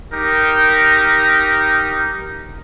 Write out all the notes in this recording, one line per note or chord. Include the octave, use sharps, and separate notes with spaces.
D#4 G4 A#4